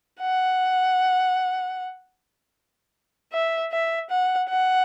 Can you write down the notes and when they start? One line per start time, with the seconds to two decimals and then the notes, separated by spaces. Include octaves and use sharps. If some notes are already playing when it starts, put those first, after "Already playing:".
0.20 F#5
3.32 E5
3.71 E5
4.10 F#5
4.50 F#5